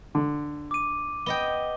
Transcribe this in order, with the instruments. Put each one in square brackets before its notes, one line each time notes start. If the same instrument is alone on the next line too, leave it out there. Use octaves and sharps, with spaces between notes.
[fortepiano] D3
[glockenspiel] D6 D#7
[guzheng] B3 D#5 G5 [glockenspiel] G7